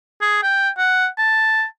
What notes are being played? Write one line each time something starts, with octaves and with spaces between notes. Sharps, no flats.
G#4
G5
F#5
A5